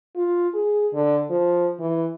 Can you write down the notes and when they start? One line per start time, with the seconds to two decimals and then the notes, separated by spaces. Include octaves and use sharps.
0.16 F4
0.54 G#4
0.93 D3
1.30 F3
1.79 E3